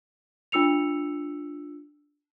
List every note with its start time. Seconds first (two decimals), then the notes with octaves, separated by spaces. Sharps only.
0.52 D4 F4 E6 C#7 F7